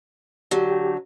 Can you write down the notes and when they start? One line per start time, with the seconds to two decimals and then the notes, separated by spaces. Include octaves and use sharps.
0.51 D3 F#3 G4